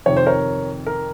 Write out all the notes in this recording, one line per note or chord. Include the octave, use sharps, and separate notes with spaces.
F2 C3 D#3 C#5
C5
A#4 C#5
A#4